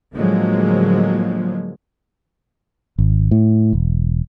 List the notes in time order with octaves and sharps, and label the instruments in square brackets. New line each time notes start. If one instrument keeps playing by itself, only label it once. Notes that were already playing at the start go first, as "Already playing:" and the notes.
[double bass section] A2 D3 F3 F#3 G#3 A#3
[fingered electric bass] G#1
A2
E1